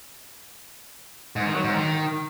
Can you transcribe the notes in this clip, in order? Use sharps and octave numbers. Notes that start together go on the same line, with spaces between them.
G#2
D#3
F#3
G#2
D#3